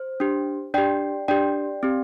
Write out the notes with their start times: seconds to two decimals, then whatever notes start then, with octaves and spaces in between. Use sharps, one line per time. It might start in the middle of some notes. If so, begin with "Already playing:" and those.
Already playing: C5
0.20 D4 G4
0.74 D4 G4 D5 G5
1.28 D4 G4 D5 G5
1.83 C4 G4